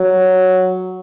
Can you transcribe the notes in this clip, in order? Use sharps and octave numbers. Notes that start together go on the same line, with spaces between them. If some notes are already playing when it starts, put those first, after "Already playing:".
Already playing: F#3